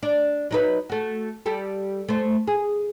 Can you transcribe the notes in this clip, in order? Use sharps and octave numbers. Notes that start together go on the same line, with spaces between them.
D4
F#3 D#4 B4
A3 F#4
G3 G4 A4
A3 C5
G#4